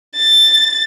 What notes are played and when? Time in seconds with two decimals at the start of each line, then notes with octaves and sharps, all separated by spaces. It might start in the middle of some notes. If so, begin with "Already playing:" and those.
0.16 A6